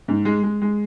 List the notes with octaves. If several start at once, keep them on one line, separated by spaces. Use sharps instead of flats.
G#2
G#3
G#3
G#3